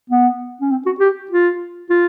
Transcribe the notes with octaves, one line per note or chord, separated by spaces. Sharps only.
B3
C#4
C4
F#4
G4
F4
F4